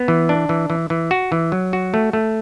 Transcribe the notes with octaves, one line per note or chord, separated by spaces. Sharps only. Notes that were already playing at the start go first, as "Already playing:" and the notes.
Already playing: B3
E3
D4
E3
E3
E3
F#4
E3
F#3
F#4
A3
A3